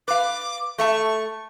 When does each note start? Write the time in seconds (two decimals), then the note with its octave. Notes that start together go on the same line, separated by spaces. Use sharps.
0.08 B4 F5 D6
0.78 A3 E5 A5 C#6